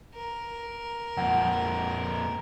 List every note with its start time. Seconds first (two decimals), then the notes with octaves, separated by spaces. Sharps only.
0.14 A#4
1.17 F2 A#2 F#5